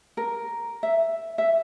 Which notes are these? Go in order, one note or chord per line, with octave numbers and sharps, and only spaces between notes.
A#4
E5
E5